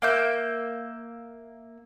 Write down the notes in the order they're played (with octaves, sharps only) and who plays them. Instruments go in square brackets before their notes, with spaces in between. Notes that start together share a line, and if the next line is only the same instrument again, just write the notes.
[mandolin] A#3 E5 G6